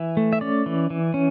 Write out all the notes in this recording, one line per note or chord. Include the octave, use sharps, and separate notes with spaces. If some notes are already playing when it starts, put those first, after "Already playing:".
Already playing: E3 E5
A3
E5
C#4 D5
E3
E3
C#4